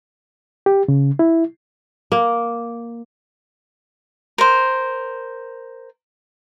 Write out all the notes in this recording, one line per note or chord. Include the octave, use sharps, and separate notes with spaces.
G4
C#3
E4
A#3
A#4 C5